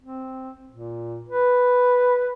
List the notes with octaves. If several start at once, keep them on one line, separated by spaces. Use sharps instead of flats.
C4
A#2
B4